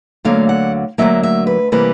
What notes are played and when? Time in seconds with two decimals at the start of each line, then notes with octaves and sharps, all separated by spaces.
0.25 D2 D3 F#3 A#3 F5
0.49 F#5
0.98 D2 D3 F#3 A#3 E5
1.23 E5
1.47 B4
1.72 C3 E3 G3 A#3 B4